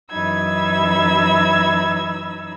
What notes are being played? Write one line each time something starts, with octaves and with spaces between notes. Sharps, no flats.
F#2 E3 D#4 B5 E6 G#6